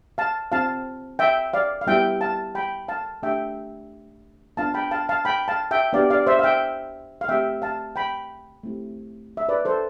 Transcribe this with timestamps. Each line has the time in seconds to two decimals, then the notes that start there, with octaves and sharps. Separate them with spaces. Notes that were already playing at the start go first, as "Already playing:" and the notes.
0.18 F5 A5
0.52 C4 F4 F5 A5
1.19 E5 G5
1.54 D5 F5
1.81 F5
1.87 G3 B3 E4 G4 E5 G5
2.21 F5 A5
2.55 G5 B5
2.88 F5 A5
3.22 A3 D4 G4 E5 G5
4.57 B3 D4 F4 F5 A5
4.74 G5 B5
4.91 F5 A5
5.09 F5 A5
5.25 G5 B5
5.48 F5 A5
5.71 E5 G5
5.93 B3 D4 G4 D5 F5
6.10 D5 F5
6.27 C5 E5
6.39 F5
6.43 E5 G5
7.21 F5
7.28 A3 C4 G4 E5 G5
7.62 F5 A5
7.96 G5 B5
8.63 A3 C4 E4 G4
9.37 E5
9.49 B4 D5
9.65 A4 C5